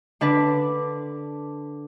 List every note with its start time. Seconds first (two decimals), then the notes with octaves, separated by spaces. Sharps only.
0.21 D3 D4 B4